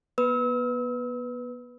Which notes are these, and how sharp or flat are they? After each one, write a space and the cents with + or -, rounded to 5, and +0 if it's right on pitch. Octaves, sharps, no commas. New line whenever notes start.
B3 -30 B4 +0 E6 -35